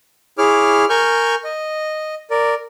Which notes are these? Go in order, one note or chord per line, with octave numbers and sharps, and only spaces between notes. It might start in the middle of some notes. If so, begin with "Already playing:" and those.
E4 G#4 C#5 D6 F6
A#4 G#5 C#6 F6 G6
D#5
A#4 D5